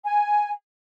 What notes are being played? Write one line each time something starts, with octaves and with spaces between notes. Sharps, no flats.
G#5